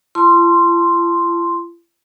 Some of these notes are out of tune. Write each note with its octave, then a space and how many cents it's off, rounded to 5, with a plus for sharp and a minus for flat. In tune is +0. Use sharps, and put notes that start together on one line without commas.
F4 -45 A5 +0 C6 +0